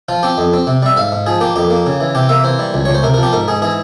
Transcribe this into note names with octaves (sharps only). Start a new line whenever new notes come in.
F3 F4
C4 G4
F2
C4
C3
G3 E5
G#2 F5
G#2
F3 G#4
A#3 G4
F2 G4
A#3
C#3
E3
C3 G4
A#3 E5
E3 C5
G3
C#2
C#2 C#5
C5
C3 A#4
F3 A#4
G4
G#2 A#4
G#2 G#4
E3 G#4